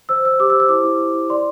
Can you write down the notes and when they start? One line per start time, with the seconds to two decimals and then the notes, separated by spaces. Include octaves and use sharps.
0.09 C5 E6
0.25 C5 E6
0.40 G4 D6
0.50 E6
0.54 C5
0.60 E6
0.69 E4 D6
0.85 E4
1.00 E4
1.14 E4
1.30 D5 C6